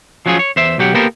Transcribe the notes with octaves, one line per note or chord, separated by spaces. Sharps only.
F3 F#3 C#4 F4 G#4
C#5
E2 C5 E5
B1 F#3 G4 F#5
A#3 B3 G4 A4 A#4 C5